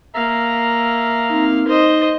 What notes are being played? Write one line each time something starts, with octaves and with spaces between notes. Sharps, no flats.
A#3 E5 F5 A#5
C4 D#4
D#4 C5 D#5